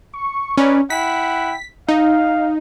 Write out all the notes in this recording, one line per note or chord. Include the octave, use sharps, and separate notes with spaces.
C#6
C#4 D#4 B4 D5
E4 F#5 G5 B6
D#4 F5